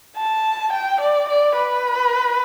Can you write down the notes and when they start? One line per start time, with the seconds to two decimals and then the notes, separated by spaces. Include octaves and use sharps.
0.17 A5
0.73 G5
1.01 D5
1.30 D5
1.57 B4